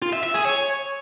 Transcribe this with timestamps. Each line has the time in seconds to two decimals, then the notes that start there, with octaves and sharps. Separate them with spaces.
0.02 F4
0.13 E5
0.24 E5
0.34 G#4
0.45 C#5